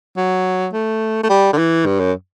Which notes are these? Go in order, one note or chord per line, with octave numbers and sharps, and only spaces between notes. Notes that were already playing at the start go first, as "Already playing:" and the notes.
F#3
A3
A3
G3
D3
E3
G2
F#2